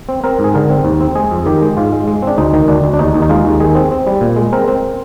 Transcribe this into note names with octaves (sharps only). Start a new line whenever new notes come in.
C4
C4 A#4
G#2
G#4
D3 A#4
C4
D#2
C4
G#3 G#4
F2
D#3 G4
G#3
G#2 F4
G#3
G#3
C4 D4
D2 D#4
D#3
D2 D4
D2
D4
D#2 D#4
D#2
D#4
G#3 F4
D#2
D#3 G#4
C4
C4
G3
A#2
G#3
C4 A#4
C4